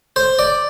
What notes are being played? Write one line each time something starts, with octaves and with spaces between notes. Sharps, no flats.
C5
D5